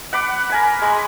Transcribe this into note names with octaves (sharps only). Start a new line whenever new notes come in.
F#5 B5 D6
A#4 G#5 B5
G#3 B5